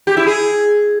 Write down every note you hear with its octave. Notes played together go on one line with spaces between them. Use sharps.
G4
E4
G#4